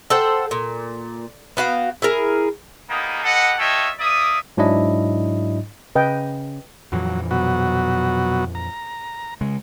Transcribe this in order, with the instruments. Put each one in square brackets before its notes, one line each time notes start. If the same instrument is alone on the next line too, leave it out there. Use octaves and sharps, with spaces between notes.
[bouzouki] A4 C5 F#5 G5
A#2
B3 F#4 F5 G5
E4 G#4 A#4
[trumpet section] G3 A#3 B3 D#4 G#4
G4 A4 B4 D#5 F#5
F4 A4 C#5 D#5 E5 G5
A#3 D5 E5 D#6
[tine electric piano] G#2 F#3 D4 E4 D#5
[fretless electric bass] C#3 [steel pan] B4 D#5 G5
[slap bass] F2 A#2 E3 [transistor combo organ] F#3
[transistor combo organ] B2 F#3 F#4
A#5
[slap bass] C#3 G#3